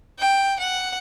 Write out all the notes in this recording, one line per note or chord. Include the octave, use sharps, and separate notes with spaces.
G5
F#5